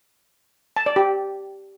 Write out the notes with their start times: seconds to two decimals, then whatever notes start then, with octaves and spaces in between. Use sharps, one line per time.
0.76 A5
0.86 D5
0.96 G4